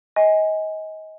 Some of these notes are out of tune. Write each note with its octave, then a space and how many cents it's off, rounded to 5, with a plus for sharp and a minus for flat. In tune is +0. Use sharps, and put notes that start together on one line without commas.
D#5 +25 G#5 -10